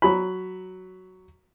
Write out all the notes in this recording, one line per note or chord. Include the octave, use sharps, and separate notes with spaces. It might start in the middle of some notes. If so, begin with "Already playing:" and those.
F#3 B5